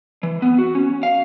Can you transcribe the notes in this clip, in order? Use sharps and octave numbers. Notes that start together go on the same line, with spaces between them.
E3
B3
F#4
C#4
F5